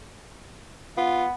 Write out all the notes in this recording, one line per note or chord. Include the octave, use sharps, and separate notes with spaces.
B3 F4